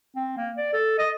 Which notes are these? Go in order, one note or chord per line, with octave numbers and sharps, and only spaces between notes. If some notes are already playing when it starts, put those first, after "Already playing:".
C4
A#3
D5
A4
D#5